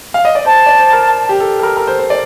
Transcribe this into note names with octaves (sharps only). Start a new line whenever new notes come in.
F5
D#5
D5
C5 A5
D5
C5
A#4
G4
A4
A4
A#4
A#4
C5
C5
D5